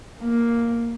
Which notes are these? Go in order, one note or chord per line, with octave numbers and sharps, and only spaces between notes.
A#3